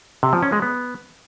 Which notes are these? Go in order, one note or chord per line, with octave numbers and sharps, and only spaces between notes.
C3
F3
C#4
G#3
B3